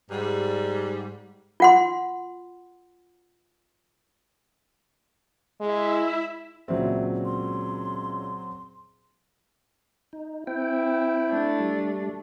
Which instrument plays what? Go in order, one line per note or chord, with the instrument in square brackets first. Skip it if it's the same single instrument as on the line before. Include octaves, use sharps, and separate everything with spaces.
[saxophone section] G#2 G3
[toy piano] F4 F#5 C6
[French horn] G#3 [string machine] E4 E5
[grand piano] C#2 A#2 C#3 [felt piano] F#3 C4 [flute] E5
[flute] C6
[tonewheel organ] D#4
[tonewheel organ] C4 G5 [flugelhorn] E4
[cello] A3 D4
[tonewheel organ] G3